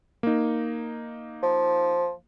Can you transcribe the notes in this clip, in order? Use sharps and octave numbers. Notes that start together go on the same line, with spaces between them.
A#3 D#4
F3